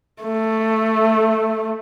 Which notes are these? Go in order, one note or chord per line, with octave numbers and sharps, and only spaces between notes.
A3